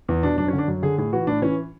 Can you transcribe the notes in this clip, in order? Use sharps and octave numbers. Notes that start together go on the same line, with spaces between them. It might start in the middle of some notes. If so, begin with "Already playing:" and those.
E2
B2 D4
F#2 D4
C#4
D3
D4
F#2
D3 G#4
A2 G#4
E3 F#4
A2 D4
E3 C#4